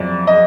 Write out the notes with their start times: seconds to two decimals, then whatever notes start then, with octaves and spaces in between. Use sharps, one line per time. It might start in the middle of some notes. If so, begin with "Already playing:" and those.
Already playing: F2 F#3 D5
0.27 D#5